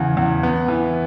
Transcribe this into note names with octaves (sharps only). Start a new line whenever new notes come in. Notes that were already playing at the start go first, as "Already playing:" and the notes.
Already playing: E2 C#3
E2
B3
E3